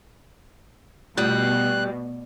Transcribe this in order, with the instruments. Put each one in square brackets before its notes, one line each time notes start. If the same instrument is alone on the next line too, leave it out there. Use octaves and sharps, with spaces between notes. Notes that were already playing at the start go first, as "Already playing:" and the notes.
[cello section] B2 [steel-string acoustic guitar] G3 [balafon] A3 C#4 F4 [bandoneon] F#6